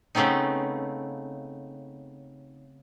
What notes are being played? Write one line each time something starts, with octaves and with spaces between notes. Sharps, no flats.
C#3 A3 B3 C4 D#4